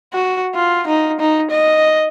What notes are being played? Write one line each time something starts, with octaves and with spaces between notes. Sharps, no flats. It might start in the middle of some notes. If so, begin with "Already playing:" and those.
F#4
F4
D#4
D#4
D#5